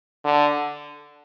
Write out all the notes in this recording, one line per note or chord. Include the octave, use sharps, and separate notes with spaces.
D3